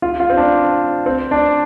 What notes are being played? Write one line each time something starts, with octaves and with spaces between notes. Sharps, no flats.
F4
F4
C4
D4
C4
D4